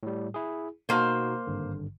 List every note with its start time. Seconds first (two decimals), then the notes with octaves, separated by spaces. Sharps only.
0.03 A2 G3
0.34 E4 G#4
0.89 B2 A#3 D#4 F#4 C5
1.47 G#1 G2 D3